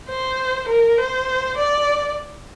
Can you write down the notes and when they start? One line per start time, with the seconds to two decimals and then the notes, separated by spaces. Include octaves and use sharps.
0.09 C5
0.68 A#4
0.98 C5
1.57 D5